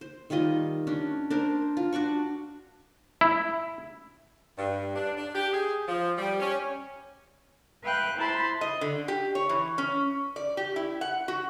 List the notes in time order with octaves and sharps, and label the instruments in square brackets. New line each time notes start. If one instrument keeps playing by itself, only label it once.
[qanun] C5
D#3 G3 F4 D#5
C#4 D4
D4 A#4 C5
F4
D4 F#4 D5 C#6
[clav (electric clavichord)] E4
[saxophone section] G2
D4
D4
G4
G#4
F3
G3
C#4
[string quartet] B4 E5 F5 G5 F#6
E4 C5 A5 B5 C6
[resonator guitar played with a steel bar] D#5
D3
G4
C#5
E3
C#4
D5
G4
E4
F#5
F#4